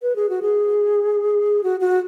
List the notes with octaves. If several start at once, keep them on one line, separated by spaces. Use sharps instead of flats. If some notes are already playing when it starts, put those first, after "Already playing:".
B4
G#4
F#4
G#4
F#4
F#4